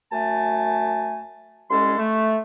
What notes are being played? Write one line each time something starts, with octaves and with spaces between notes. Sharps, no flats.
F#2 A3 G#5 A5
C2 G#3 C#4 A4 C6
A3